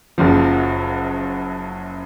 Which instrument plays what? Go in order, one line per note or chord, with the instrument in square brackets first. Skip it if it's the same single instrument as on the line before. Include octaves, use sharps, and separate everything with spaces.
[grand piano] F#1 F#2 F3